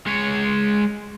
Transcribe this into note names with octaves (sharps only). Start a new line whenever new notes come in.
G#3 C#5